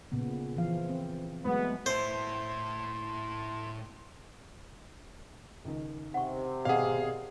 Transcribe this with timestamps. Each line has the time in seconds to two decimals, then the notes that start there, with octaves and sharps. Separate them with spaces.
0.12 A#2 C#3 B3
0.57 E3 F3 F5
0.89 C4
1.45 F#3 G#3 A3 B3
1.86 A2 E4 C5 C6
5.65 C#2 D#3
6.14 C3 F#5 C#6
6.65 G#1 B2 G#4 D5 D#5 F5 F#5